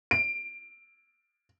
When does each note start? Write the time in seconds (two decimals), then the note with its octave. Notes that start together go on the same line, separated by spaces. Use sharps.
0.11 D7